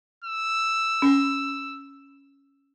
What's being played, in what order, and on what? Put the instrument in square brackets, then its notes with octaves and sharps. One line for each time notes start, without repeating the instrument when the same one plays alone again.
[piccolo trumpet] E6
[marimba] C#4